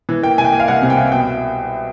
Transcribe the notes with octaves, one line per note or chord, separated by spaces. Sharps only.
E3
A#3 G5
C2 G#5
G5
A#3
F5
C2 F#5
C3
G5
C2
B2 G5